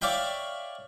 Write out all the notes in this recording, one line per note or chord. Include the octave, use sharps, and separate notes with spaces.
C#5 D5 E5 F5 G5 B5